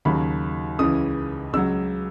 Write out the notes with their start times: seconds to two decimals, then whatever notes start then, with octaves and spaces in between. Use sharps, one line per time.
0.05 D#2 C#3 F#3 B5
0.79 C#2 C#3 E3 D#6
1.53 C#2 C#3 F#3 E6